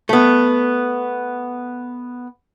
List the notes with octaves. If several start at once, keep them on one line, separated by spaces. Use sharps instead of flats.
A3 B3